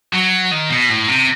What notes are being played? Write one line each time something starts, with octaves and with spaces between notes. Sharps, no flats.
F#3
D#3
B2
A2
C3